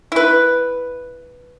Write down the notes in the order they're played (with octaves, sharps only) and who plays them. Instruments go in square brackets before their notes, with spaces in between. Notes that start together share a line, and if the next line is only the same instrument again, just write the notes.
[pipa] E4 B4